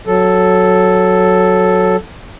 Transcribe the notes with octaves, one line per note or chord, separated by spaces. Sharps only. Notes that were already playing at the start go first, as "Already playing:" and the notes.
F#3 A4